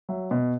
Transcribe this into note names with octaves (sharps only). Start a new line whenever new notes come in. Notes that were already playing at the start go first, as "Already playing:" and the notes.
F#3 E5
B2